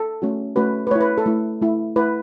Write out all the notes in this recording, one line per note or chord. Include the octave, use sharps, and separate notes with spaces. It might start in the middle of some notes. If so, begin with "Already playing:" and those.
Already playing: A4
A3 C#4 F#4
A3 C#4 F#4 B4
B4
A3 E4 C#5
B4
A4
A3 E4
A3 E4
A3 E4 B4